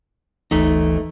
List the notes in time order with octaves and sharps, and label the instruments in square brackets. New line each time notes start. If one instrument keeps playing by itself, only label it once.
[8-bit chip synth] G1 D2 E3 [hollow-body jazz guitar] A3 D#4